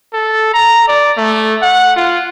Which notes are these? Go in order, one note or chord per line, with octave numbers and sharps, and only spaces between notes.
A4
A#5
D5
A3
F#5
F4